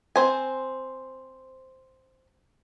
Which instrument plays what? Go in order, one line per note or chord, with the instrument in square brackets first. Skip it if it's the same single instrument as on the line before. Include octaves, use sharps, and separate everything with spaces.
[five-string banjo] C4 C5 G#5